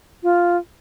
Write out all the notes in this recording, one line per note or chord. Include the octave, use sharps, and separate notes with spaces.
F4